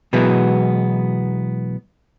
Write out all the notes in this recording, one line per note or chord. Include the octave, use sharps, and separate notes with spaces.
B2 E3 F#3 G#3 B3